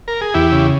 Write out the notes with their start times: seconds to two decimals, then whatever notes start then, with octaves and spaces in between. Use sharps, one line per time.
0.08 A#4
0.21 G#4
0.34 E2 E4 G4
0.52 C#3